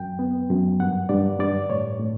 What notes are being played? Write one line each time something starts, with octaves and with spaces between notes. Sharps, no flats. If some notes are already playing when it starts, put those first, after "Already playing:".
Already playing: F#2 G5
B3
F#2
G2 F#5
G2 D5
G2 D5
A2 C#5
A2